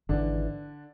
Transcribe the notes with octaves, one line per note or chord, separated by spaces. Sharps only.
G#1 G#2 D3 E3 D4